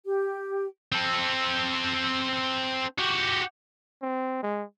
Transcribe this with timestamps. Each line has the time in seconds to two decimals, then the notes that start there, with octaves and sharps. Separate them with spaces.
0.05 G4
0.92 C4 A4
2.99 F#4 G4
4.02 C4
4.43 G#3